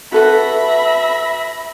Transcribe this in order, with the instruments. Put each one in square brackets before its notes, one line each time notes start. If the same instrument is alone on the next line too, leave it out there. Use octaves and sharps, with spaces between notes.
[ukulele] F#4 A4 B4 [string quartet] E5 B5 A#6